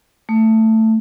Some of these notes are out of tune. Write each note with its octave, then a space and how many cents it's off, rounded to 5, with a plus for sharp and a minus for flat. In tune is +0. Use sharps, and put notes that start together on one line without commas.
A3 +10